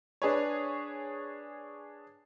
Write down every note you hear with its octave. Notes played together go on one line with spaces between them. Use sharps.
D4 G#4 B4 C#5